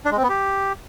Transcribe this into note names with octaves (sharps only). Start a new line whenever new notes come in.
D4
G#3
C4
B3
G4